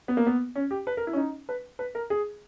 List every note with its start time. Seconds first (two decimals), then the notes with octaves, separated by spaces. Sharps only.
0.08 B3
0.17 A#3
0.26 B3
0.55 C#4
0.71 G4
0.87 B4
0.97 A#4
1.07 E4
1.13 C#4
1.17 D#4
1.49 B4
1.79 B4
1.95 A#4
2.10 G#4